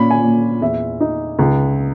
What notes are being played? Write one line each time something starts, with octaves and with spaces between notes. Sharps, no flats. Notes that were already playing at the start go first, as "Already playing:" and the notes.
Already playing: A#2 C#4 B5
G#5
A#2
E2 E5
D#4
C#2